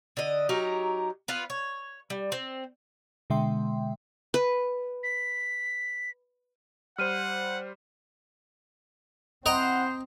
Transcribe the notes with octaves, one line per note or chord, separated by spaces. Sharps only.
D3 D#5
F#3 D#4 G4 A#4
B3 F4 B4
C#5
G3
C4
B2 D3 G#3 E5 G5 C6
B4
B6
G3 C5 F#5 F6 D#7
C4 E4 C5 D#5 F#5 G5 A#5